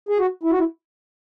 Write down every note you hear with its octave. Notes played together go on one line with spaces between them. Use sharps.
G#4
F#4
E4
F#4
E4